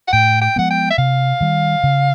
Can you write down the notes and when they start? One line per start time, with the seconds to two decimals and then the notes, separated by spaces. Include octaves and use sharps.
0.08 F#5
0.13 A2 G5
0.41 G5
0.56 F3 G#3 B3 F#5
0.70 G5
0.90 E5
0.98 C3 F5
1.40 D#3 G3
1.83 C#3